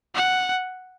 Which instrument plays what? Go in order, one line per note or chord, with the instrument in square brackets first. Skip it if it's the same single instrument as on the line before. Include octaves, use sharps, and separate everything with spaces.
[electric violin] F#5